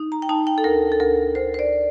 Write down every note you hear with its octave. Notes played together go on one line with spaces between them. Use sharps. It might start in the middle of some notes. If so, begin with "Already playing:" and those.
Already playing: D#4
A#5
G5
D#4 A5
G5
A4
D2 A#4
A4
D2 A#4
D2 C5
C5
D5